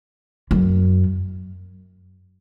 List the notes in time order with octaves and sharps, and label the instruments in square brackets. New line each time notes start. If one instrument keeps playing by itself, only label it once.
[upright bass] F#2